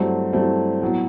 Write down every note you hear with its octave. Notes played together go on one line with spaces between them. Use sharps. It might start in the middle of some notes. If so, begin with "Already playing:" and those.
Already playing: G2 F#3 A3 C4 E4
G2 F#3 A3 C4 E4
A2 F#3 B3